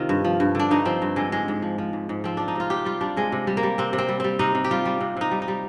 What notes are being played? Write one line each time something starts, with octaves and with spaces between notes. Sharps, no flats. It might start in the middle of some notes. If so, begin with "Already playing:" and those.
Already playing: C3 D#3 F4
G2
F3
G2
D3 D4
G2 D#4
F3 C4
G2
D3 G#3
G#2 G#3
G#2
F3
F3
G#2
G#2
F3 C4
F3 D4
D#4
C3 F4
C3 G4
G3 F4
G3 D4
C3 G#3
C3
G3
A#3
G3
C3 C4
C3
C4
G3
G3 C4
C3 D#4
C3
G4
G3 F4
G3
C3
C3 D#4
G3
D#4
G3